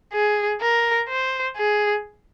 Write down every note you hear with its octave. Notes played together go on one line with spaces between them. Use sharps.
G#4
A#4
C5
G#4